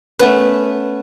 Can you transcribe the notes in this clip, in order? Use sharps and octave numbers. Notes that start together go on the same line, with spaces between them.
A3 B3 C#4 B4